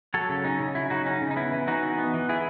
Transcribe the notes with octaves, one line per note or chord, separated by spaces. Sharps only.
F#3 A4 C#5
C#3
C#4 D#4
C#3
F#3 E4
C#3 D#4 F#4
C#4 D#4
C#3
D#4
B3 E4
E3
E3 D#4 F#4
B3
B3
E3
E3 E4 G#4